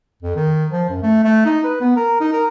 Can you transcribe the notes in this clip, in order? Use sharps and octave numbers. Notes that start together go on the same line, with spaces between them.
F2
D#3
F3
F#2
A3
A3
D#4
B4
B3
A#4
D#4
A#4